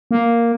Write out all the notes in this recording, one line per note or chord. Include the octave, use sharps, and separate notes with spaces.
A#3